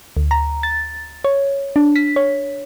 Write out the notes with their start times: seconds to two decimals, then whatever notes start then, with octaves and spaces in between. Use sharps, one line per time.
0.17 D2
0.31 A#5
0.63 A6
1.25 C#5
1.76 D4
1.96 B6
2.16 C#5